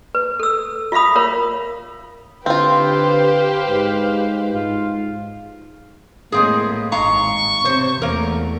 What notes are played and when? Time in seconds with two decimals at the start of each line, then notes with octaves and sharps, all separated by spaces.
0.15 B4
0.40 A4 E6
0.92 F4 E5 F5 B5 D#6
1.16 F4 A#4 C#5 F5
2.46 D3 C4 F4 G4 B4 C5 F5
3.68 G#2
4.54 G#2 F4
6.32 A2 G#3 A#3 C4 G#4
6.92 G#1 G#3 F5 A#5 C#6
7.64 C3 C5 C#5
8.02 E2 A3 A#3 A#4